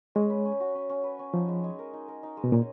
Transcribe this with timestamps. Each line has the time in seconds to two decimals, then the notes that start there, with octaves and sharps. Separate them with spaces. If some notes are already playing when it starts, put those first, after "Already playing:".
0.15 G#3 C#4
0.30 B4
0.45 C#4
0.60 F#4
0.75 C#4
0.89 C#4
1.04 B4
1.19 C#4
1.33 F3 D#4
1.48 G#3
1.64 G#3
1.79 A#4
1.93 D#4
2.08 A#4
2.23 D#4
2.37 G#3
2.44 B2
2.52 A#2 C#4